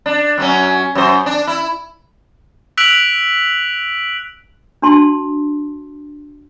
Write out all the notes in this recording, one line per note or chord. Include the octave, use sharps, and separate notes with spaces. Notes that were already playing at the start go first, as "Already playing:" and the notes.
D4
F#2 F#3 C#4
F#2 C5
D4
E4
E6 F#6 B6 D7 F7 F#7
D4 F#4 A5 C6